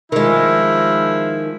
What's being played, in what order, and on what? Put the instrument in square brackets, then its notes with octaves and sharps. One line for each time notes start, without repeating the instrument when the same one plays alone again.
[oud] D#3 G#3 [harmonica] F3 E4